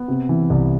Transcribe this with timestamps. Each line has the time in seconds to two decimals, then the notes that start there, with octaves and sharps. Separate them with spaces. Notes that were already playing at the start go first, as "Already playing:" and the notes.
Already playing: B3
0.08 C3
0.29 E3
0.50 C2